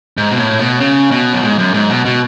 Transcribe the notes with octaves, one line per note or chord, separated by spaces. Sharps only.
G#2
B2
A2
B2
C#3
B2
F#2
G#2
F#2
G#2
B2
B2